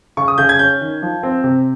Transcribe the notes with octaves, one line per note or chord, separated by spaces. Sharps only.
C#3 C#6
D#6
C#3 G6
G#6
C#4 G6
D#3
F3
C4
C3